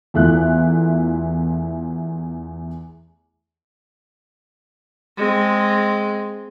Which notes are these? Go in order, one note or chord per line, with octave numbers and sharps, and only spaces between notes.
E2 A3 E4 F4 F#6
G#3 C4